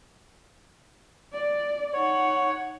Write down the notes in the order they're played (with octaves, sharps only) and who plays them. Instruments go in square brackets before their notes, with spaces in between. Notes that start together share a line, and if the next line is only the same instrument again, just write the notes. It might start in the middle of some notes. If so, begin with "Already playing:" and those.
[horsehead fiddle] D5
[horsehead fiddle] D#4 F#5 [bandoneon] C#5